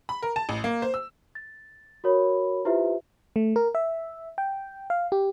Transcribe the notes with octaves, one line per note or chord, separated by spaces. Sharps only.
B5
A#4
A5
A1
A#3
C5
E6
A6
F#4 A#4 C#5 B5
E4 F4 G4 B4 C5 E5
A3
A#4
E5
G5
F5
G4